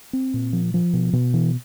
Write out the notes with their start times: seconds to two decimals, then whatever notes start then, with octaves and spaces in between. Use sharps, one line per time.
0.13 C4
0.34 A#2
0.53 F3
0.74 F3
0.93 B2
1.13 B2
1.34 E3